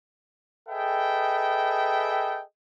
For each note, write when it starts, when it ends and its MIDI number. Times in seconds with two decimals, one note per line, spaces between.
0.69 2.42 68
0.69 2.42 69
0.69 2.42 71
0.69 2.42 75
0.69 2.42 76
0.69 2.42 79